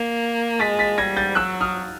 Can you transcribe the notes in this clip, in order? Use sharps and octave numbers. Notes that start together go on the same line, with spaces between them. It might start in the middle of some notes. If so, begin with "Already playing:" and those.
Already playing: A#3
G#3 A6 B6
A6 B6
G3 G#6 A#6
G6 A6
F#3 E6 F#6
D#6 F6